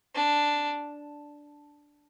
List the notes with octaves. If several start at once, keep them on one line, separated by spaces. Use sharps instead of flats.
D4